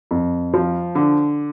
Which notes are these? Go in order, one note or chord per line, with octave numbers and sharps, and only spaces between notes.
F2
F3
D3